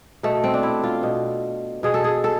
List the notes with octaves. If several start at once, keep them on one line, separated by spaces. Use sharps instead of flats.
B2 A3
C4
D4
E4
F4
B2
B2 G#4
A4
G#4
A4